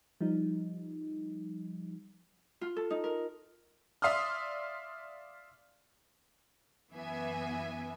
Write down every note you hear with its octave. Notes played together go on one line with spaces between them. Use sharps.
F3 G3 D#4
F4
A4
D#4
A#4
D5 E5 F5 C6 D#6 F6
F#2 E3 B3 E5 G#5